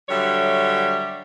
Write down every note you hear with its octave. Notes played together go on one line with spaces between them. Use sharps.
D3 F#3 G3 C#5 E5